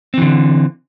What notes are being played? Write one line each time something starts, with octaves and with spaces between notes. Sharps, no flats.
D3 E3 C4